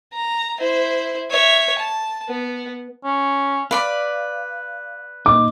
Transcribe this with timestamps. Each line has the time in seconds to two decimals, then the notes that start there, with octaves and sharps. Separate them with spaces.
0.13 A#5
0.60 E4 C5
1.30 C#5 E5
1.79 A5
2.29 B3
3.04 C#4
3.71 B4 D5 F5 B5
5.26 A#2 D#4 D6